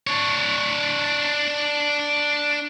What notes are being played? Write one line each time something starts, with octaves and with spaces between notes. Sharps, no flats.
D4 C#5